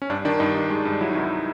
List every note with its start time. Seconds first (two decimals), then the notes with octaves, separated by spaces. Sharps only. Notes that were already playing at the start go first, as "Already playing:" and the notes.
0.02 C#4
0.10 G2 D4
0.25 D#3 D4
0.40 G2 D#4
0.55 G2
0.70 G#3
0.85 G2
1.01 F#3 E4
1.11 C2 D#4
1.21 E4